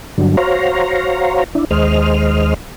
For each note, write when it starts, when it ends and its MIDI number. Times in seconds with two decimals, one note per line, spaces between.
0.18 0.36 43
0.18 0.36 50
0.18 0.36 54
0.37 1.44 66
0.37 1.44 72
0.37 1.44 73
0.37 1.44 77
0.37 1.44 82
1.55 1.65 62
1.55 1.65 64
1.71 2.54 39
1.71 2.54 56
1.71 2.54 72
1.71 2.54 75
1.71 2.54 89